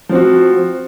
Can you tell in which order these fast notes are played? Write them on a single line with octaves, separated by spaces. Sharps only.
F3 C4 F#4